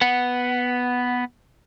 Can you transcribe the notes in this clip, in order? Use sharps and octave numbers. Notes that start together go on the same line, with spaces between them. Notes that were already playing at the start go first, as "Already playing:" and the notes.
B3 F#5